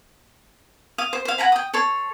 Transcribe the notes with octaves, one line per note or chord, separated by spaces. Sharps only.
F5 D#6
C5
C5 F5
F#5 G#5 A#5 B5
G5 D#6
A4 C#5 C6